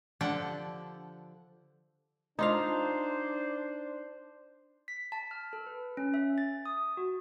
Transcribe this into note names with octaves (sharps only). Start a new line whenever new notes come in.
D3 F3 D4 G4 A4 F#5
D4 D#4 F4 C5 F5
B6
A5
F6
A4
B4
C#4
E5
A6
D#6
F#4